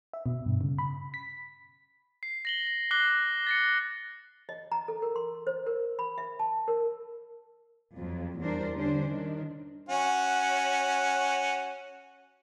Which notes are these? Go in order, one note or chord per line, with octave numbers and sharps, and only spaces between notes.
E5
B2
G2
C#3
B5
B6
C7
A#6 F#7 G7
A#6
D6 F#6 A#6 C7 G7
A6 A#6 C#7
D#5
A#5
A4
A#4
C6
C5
A#4
B5
E5
A5
A#4
F2 F#3
E2 G3 D4 A#4 C5
D3 G3 C#4 D4 C5
D#3 D4
C#4 F#4